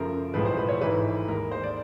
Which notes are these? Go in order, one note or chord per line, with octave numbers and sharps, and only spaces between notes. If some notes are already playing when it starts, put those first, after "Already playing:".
Already playing: F#2 C#3 F3 A3 A#4
B1 A2 F3 G#3 B4
C5
B4
C#5
G#1 G#2 E3 A3 B4
D#2 D#3 G#3 A#4
C5
D5